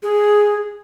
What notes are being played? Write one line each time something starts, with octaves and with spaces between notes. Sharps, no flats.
G#4